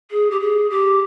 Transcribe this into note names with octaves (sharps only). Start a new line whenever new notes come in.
G#4
G4
G#4
G4